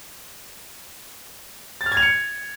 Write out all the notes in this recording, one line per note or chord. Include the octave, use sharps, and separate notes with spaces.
A6
F6
G#6
F7
C#7